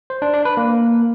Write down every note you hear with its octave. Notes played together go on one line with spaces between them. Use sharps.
C5
D4
D4
B4
A#3